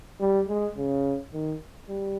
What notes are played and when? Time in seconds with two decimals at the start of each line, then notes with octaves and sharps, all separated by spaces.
0.20 G3
0.48 G#3
0.77 C#3
1.33 D#3
1.89 G3